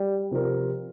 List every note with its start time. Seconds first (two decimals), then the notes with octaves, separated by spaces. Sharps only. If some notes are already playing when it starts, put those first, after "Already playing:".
Already playing: G3
0.31 C3 F3 C4 F4 A#4